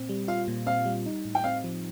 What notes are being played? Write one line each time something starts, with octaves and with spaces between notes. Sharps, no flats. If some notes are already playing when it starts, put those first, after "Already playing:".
Already playing: A#2 C4
G3
F4 F5
A#2
C4 F5
G3
D#4
A2
G5
C4 F5
F3